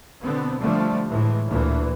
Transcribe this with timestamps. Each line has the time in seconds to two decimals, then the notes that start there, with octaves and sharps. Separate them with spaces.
0.23 B2 D3 B3 C4
0.61 D3 F3 G3 A3
1.08 A2 E3 G#3
1.48 D2 A#2 E3